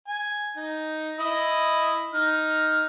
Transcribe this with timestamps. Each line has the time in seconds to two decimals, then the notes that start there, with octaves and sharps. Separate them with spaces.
0.08 G#5
0.57 D#4
1.19 E4 D#5
2.14 D#4 F6